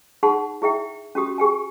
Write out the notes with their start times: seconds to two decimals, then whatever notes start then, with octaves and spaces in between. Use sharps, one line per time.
0.23 D#4 G#4 F#5 A5 C6
0.62 E4 G#4 E5 G5
1.15 C#4 F#4 G4 D#6
1.38 G4 G#4 G5 G#5